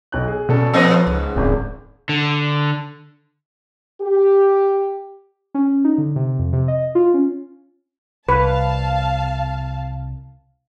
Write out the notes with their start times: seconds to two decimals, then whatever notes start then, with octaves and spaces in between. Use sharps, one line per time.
0.12 B1 C#5 F#6
0.28 G#4
0.49 B2 C#4 A4 D5
0.74 A#2 F3 C4 A4 B4 C#5 D#5
1.07 C#2 G#2
1.36 D1 G#1 C#2 F#2
2.09 D3
4.02 G4
5.55 C#4
5.84 D#4
5.98 D3
6.16 C3
6.39 F2
6.53 C3
6.68 D#5
6.95 F4
7.14 C#4
8.29 C2 B4 F5 A5